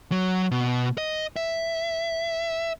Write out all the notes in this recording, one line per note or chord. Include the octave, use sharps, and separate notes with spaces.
F#3
B2
D#5
E5